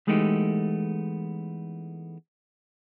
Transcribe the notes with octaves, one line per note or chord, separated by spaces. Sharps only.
E3 G#3 A3 B3 D#4 G4